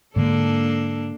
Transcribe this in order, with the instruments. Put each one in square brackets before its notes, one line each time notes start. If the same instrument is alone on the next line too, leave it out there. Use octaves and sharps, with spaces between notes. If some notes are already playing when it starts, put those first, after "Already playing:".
[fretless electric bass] G#2 D3 [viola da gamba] A#3 D4 A4